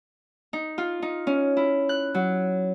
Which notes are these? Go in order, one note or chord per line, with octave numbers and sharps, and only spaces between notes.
D#4
F4
D#4
C#4
E4
F#6
F#3